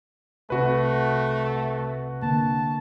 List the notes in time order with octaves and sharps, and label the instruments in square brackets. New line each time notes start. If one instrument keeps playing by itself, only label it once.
[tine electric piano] C2 C3 C4 [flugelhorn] A3 [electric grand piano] F#4 B4
[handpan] D3 A#3 [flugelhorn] A5